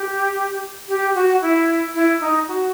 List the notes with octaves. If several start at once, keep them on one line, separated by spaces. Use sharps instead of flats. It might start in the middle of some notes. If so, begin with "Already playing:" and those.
Already playing: G4
G4
F#4
E4
E4
D#4
F#4